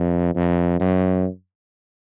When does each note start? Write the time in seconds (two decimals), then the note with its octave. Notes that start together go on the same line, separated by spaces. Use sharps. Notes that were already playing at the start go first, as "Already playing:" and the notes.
Already playing: F2
0.36 F2
0.80 F#2